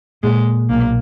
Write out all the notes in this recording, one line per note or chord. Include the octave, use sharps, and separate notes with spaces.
A#2 G#3
B1 A#3